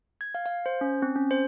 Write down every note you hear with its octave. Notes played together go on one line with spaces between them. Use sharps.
G#6
F5
F5
C5
C#4
C4
C#4
C5